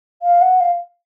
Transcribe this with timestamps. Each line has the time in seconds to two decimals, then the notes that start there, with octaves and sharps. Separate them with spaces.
0.22 F5
0.41 F#5
0.60 F5